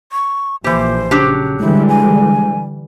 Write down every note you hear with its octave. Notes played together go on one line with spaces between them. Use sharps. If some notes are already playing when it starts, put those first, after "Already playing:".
C#6
A#1 A#2 E3 G4 C5
C#3 F#3 D4 G4
D3 E3 G3 G#3 E4
G#5